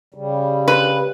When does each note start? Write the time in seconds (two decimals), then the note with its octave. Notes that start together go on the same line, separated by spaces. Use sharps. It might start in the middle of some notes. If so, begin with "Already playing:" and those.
0.14 C#3 G3
0.68 B4